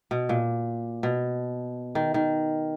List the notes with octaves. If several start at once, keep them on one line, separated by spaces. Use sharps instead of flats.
B2
A#2
B2
D#3
D#3